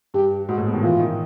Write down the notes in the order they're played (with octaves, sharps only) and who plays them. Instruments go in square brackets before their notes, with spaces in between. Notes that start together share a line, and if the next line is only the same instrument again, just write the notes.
[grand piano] G2 [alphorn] G4
[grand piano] G#2 [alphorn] F#4
[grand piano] A2
B2
D#3
[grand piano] E3 [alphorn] F4
[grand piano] D#3